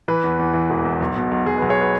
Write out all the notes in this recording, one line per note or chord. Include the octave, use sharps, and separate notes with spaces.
E3 B4
E2
E2
E3
E1
E2
B1
B2
B1
B1 G#4
B1 B4
G#4 C#5
B4